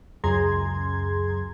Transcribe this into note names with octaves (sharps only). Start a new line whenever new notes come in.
C#2 F#2 G#4 A#5 C6 G#6